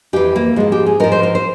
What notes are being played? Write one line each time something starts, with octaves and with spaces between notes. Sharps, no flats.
F2 E3 G4
A#3
G#2 F3 G#3
G4
G#4
G#2 F3 A#4
C5
A#4
C5